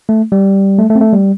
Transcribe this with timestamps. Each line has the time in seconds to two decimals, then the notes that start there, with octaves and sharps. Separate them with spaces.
0.09 A3
0.32 G3
0.78 A3
0.90 A3
0.96 C4
1.01 A3
1.13 G3